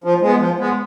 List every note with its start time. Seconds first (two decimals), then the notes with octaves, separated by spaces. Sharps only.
0.04 F3
0.22 G#3 B3
0.40 F3
0.59 G#3 B3